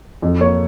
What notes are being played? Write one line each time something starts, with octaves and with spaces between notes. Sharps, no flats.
F2
A#3 C#5